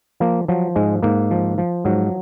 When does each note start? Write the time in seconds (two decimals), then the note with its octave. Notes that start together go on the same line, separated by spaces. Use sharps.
0.20 F3 A#3
0.48 F3 F#3
0.76 G#2 G#3
1.03 G#2 A#3
1.31 F3
1.58 F3
1.85 G#2 F#3